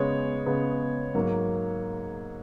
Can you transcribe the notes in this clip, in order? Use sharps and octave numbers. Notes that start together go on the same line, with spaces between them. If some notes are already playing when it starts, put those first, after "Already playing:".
Already playing: C#3 G#3 B3 C#5
C#3 G#3 B3
G#2 F#3 A#3